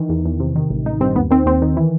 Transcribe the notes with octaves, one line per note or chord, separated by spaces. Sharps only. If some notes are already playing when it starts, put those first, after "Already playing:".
Already playing: D#3 E3
E2
E2
C3
D#3
A1
A1 D#4
G2 C4
D#2 B3
D#3 C4
D#2 C4
D#3
E3